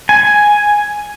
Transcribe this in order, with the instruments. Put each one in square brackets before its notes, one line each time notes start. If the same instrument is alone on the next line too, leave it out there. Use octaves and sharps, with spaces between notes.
[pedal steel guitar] G#5